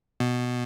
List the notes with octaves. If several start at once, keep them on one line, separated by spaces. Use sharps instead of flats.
B2